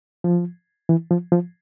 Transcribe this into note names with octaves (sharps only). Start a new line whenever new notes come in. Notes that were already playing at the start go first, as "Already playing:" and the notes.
F3
E3
F3
F3